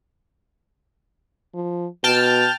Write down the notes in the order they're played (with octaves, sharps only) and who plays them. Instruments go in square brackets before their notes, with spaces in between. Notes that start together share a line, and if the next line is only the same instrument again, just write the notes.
[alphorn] F3
[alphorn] B2 [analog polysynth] G5 A5 F6